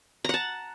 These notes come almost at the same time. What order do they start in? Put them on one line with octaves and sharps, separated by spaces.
A#5 F#5 A5